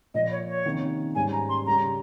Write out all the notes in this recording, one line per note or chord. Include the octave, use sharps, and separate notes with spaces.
A#2 F3 A#3 D#5
C#5
C#5
C3 D#3 A#3 C#4
G#2 G3 C#4 G#5
A#5
C6
C#3 G3 C#4 G4 A#5